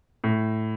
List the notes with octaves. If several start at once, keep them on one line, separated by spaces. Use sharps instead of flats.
A2